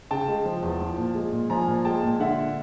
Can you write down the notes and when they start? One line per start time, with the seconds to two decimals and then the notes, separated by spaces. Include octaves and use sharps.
0.11 C#3 G5 A5
0.28 G#3
0.45 F3
0.62 E2
0.81 F3
0.98 A#2
1.15 G#3
1.32 A#2
1.50 F3 G#5 A#5
1.67 A#2
1.85 G#3 G5 A5
2.03 A#2
2.19 D3 E5 F#5